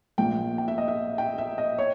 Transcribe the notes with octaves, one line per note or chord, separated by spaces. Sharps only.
A#1 A#2 G5
G5
E5
D#5
E5
G5
E5
D#5
C#5